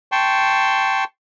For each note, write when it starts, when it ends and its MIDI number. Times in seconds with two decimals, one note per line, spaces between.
0.12 1.04 79
0.12 1.04 81
0.12 1.04 84
0.12 1.04 85